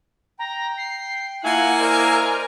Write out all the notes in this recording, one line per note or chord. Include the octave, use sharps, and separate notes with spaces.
G5 A#5
C7
A#3 E4 F4 F5 F#5 G#5
A#4 C5 D5 D#5